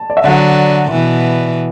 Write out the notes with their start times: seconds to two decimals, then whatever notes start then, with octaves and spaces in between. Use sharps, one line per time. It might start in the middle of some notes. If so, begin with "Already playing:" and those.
Already playing: A5
0.10 D5
0.17 E5
0.24 D3 F#3 D5 F#5
0.92 B2 E3